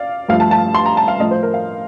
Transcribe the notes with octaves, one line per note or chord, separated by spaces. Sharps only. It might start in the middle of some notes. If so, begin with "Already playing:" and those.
Already playing: D5 F5
G2 F3 A3 F5
A5
A5
C6
A#5
A5
F5
A2 F3 A3 D#5
C5
A#4
F5